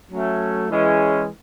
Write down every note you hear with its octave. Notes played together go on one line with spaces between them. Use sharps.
F#3 A3 C#4
E3 G#3 C#4